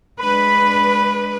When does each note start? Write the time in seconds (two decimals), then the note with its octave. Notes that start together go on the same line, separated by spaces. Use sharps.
0.20 G#3 D4 B4 B5